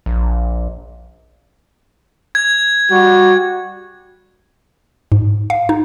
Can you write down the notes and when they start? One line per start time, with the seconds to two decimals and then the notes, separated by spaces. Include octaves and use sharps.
0.06 A#1
2.35 G#6
2.90 G3 F#4
5.12 G#2
5.50 F5
5.69 D#4